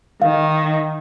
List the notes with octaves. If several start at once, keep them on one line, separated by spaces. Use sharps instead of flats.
D#3 F5